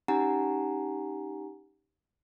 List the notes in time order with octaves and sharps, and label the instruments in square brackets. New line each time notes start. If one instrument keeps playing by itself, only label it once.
[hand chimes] C#4 D#4 G4 F#5 G#5 A#5